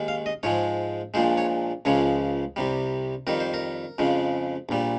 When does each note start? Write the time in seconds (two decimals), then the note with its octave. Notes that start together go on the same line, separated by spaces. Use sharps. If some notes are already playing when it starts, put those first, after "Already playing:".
Already playing: D#2 D#3 G#3
0.08 F5
0.26 D#5
0.43 G#2 F3 G#3 C#5
1.14 A#1 A#2 F3 G#3 C5
1.37 C#5
1.85 C#2 C#3 F3 G#3 C#5
2.56 C2 C3 G3
3.27 F2 D#3 G3 A#4
3.40 C5
3.54 A#4
3.98 F2 C#3 F3 G#3
4.69 A#1 A#2 G3